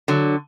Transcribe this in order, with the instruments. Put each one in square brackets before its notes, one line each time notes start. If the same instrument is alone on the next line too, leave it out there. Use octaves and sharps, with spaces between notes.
[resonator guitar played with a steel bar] D3 F#3